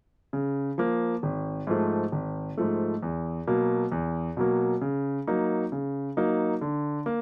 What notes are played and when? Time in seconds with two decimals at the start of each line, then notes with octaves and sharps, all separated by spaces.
0.33 C#3
0.78 F3 A#3
1.23 G#1
1.67 G#2 F3 A3
2.12 G#1
2.57 G#2 F3 A3
3.03 E2
3.47 B2 F#3 A#3
3.92 E2
4.37 B2 F#3 A#3
4.82 C#3
5.27 F#3 A#3 D#4
5.72 C#3
6.17 F#3 A#3 D#4
6.61 D3
7.06 A#3